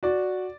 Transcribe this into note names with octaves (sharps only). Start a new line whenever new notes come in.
F#4 D5